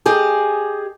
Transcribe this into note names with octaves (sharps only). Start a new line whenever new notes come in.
G4 G#4 D#5